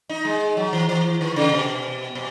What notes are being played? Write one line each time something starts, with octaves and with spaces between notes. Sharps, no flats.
D#4
G#3
F#3
E3
E3
D#3
C#3
B2
B2